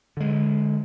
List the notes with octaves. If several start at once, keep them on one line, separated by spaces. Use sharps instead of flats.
D3 G#3